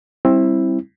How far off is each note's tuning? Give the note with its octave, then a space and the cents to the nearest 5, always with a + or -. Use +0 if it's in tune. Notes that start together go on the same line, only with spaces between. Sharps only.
G3 +0 C4 +20 E4 +0